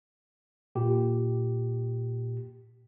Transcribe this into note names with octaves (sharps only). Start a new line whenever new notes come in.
A#2 G4